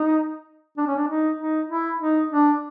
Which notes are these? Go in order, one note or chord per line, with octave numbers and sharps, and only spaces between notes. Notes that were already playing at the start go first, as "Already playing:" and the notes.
Already playing: D#4
D4
C#4
D4
D#4
D#4
E4
D#4
D4